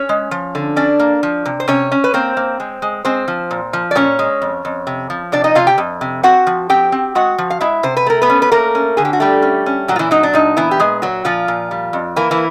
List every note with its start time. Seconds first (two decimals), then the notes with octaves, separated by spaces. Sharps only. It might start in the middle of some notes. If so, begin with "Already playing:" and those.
Already playing: C#4 C#5
0.09 G#3
0.31 F3
0.55 D3
0.76 C#4 D4 D5
0.99 A#3
1.23 F3
1.45 C3
1.60 C5
1.68 C3 C#4 C#5
1.92 C#4
2.04 B4
2.14 A#3 C4 C5
2.37 A#3
2.60 G#3
2.82 G#3
3.05 G#3 C4 C5
3.28 F3
3.51 A#2
3.73 F3
3.91 D5
3.95 A#2 C#4 C#5
4.19 G#3
4.42 F2
4.65 F2
4.87 C3
5.10 F3
5.32 C3 D4 D5
5.44 D#4 D#5
5.55 C3 F4 F5
5.67 G4 G5
5.78 F2
6.01 C3
6.23 C4 F#4 F#5
6.47 F3
6.70 C4 G4 G5
6.92 C4
7.15 G#3 F#4 F#5
7.38 F3
7.50 F5
7.61 G#3 E4 E5
7.83 C3 C5
7.97 B4
8.06 A3 A#4
8.22 B3 B4
8.30 C#4
8.42 B4
8.51 A3 A#3 A#4
8.75 C#4
8.97 D3 G#4
9.05 G4
9.13 F#4
9.20 G3 A3 G4
9.42 C#4
9.66 C#4
9.88 A#2 F#3 F#4
9.96 F4
9.99 E3 E4
10.11 F#3 D#4
10.23 D4
10.33 A#2 D#4
10.57 E3 B3 E4
10.71 G4
10.80 A#2 G#3 G#4
11.02 A#2 F#3 F#4
11.25 A#2 F3 F4
11.48 A#2
11.71 G3
11.93 F2
12.16 E3 A#3 E4
12.31 E3 E4